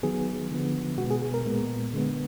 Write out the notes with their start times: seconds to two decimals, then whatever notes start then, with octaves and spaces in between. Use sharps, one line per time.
0.03 D#3 F#3 B3 G#4
0.51 D3 F3 B3
0.98 B2 G#3 B3 F#4
1.10 G#4
1.22 G#4
1.34 A#4
1.46 A#2 G#3 B3
1.93 D3 G#3 B3